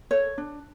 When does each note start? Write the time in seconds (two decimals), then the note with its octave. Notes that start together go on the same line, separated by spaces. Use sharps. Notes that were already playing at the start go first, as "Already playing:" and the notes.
0.11 A4 C#5
0.38 D4